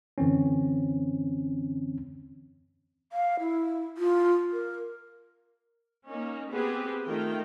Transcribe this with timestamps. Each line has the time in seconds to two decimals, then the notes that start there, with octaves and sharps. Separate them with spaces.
0.18 F#2 D3 E3 C4 C#4
3.12 F5
3.40 E4
3.97 F4
4.53 A#4
6.08 A#3 C#4 D#4
6.51 B3 C4 G4 G#4 B4
7.06 D#3 A3 F4 A#4 G5